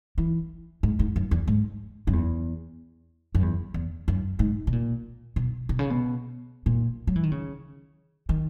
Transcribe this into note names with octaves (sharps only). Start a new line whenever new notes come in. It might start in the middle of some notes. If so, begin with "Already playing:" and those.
E3
G#2
G#2
F#2
E2
G#2
F#2
E2
F#2
E2
E2
F#2
G#2
B2
A#2
B2
B2
C#3
B2
A#2
F#3
E3
D#3
C#3
D#3